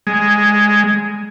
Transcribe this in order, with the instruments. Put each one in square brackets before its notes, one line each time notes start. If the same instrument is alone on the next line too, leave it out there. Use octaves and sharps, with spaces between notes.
[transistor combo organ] G#3